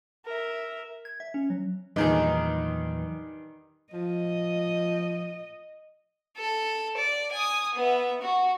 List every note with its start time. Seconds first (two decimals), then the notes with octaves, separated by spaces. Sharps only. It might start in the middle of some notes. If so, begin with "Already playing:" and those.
0.25 A#4 E5
1.05 G#6
1.20 E5
1.34 C#4
1.50 F#3
1.96 E2 G2 A#2 D#3 E3 F#3 D#4 G#4
3.93 F3 D#5
6.37 A4
6.97 D5
7.32 G#5 D#6
7.75 B3 E5
8.22 F#4